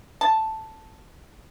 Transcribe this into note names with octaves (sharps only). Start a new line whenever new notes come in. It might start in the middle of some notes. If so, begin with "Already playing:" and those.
A5